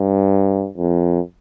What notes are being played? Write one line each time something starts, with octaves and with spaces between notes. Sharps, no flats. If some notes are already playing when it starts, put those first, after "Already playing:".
Already playing: G2
F2